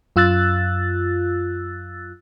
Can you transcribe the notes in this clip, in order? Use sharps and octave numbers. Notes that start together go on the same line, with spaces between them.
F#2 F4 E6 F#6 A6